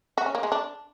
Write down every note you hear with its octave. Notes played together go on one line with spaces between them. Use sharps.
F#4
C#4
A#3
G#3
D4